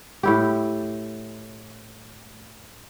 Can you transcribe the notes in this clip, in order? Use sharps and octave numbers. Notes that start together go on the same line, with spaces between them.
A2 E4 G4